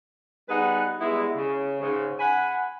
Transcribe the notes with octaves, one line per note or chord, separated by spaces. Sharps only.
G3 B3 D#4 G#4 B4 F#5
G3 G#3 B3 E4
C#3
G#2 C#3
F#5 G#5 B5